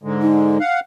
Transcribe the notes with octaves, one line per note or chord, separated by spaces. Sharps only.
G#2 D3 G#3
D#4
F5 F#5